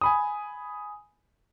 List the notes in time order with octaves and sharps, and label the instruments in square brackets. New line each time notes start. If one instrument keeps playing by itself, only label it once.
[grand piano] G#5 B5 D#6